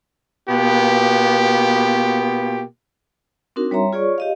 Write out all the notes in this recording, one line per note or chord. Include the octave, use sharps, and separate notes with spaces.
B2 A#3 B3 F4 G4
C4 D4 D#4 F#4 A#4
G3 C#5 E5 A#5 C6
F4 G#4 C#5 D5 C#6
G4 D#5 F5